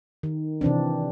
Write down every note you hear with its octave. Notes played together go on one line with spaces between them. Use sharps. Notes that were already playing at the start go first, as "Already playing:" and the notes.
D#3
C3 E3 C4 D4